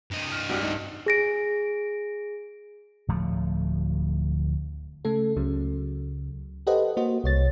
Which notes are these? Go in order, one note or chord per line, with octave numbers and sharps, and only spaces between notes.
G2 D#5
F6
C2 D4 F#4 G4 F6
D#4
G#4 A#6 D7
D1 F3 A3
C#3 A3 A4
C#2 C#3 F#3
G4 A4 B4 C5 D#5 F#5
A#3 F#4 C5 D#5
C2 C#5 A6